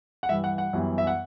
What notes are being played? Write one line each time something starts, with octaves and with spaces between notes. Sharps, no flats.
F#5
G2 E3 G3 E5
F#5
F#5
F#2 E3 G3 B3
E5
F#5